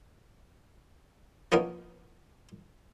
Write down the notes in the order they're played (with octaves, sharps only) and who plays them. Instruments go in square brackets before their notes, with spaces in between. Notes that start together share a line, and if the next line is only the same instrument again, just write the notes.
[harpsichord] F3 A#3 B3 C#4 D#4 A#4